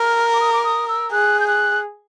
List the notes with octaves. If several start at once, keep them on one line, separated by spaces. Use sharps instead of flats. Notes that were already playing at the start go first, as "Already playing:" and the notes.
Already playing: A#4 F6
D6
D#6
D6
D#6
E6
G#4 F#6
G6
F#6